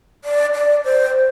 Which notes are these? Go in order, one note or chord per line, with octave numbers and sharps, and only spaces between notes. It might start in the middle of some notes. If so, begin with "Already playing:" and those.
D5
D5
C5